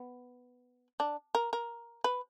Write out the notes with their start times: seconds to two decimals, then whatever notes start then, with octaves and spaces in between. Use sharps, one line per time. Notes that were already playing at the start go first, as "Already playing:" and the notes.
Already playing: B3
1.00 D4
1.35 A#4
1.53 A#4
2.04 B4